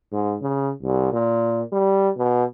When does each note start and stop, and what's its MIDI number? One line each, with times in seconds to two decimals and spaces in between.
0.12 0.36 44
0.42 0.72 49
0.82 1.11 36
1.13 1.62 46
1.72 2.09 55
2.17 2.44 47